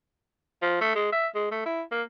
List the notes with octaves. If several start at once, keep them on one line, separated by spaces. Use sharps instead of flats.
F3
A3
G#3
E5
G#3
A3
E4
A#3